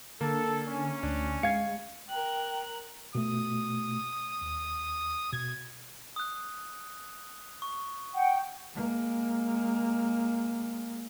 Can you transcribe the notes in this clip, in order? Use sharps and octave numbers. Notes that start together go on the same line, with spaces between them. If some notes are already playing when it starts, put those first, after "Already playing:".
D3 A#3 A4
C#4
D2 D4
G#3 F5 G#6 C#7
A#4 G5 F#6
B2 A3 D#6
D#2
B2 G#6
D#6 F#6
C#6
F#5 G5
G#3 A#3